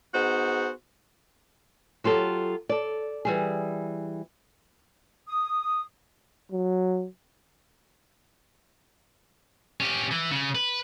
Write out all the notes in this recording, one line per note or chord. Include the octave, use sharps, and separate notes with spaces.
B3 D#4 F#4 G#4 C5
F#3 F4 G4 A4
A4 D5
E3 G3 G#4
D#6
F#3
C#4 G4
E3
C#3
B4